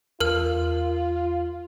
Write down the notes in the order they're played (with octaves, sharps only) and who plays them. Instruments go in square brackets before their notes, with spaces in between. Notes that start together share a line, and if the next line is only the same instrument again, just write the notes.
[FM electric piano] E2 [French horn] F4 [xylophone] A#4 F6